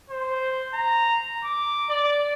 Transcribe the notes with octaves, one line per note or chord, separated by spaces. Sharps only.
C5
A#5
D6
D5